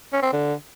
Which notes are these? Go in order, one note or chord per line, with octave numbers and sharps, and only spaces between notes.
C#4
C4
D3